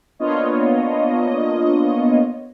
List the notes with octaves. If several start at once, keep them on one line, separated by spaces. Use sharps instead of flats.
A#3 B3 D4 F4 C#5 D#5